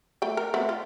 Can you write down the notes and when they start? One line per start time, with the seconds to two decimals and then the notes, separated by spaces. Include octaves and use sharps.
0.22 A3 G5
0.37 A#4
0.54 A3 B3 C4
0.69 F4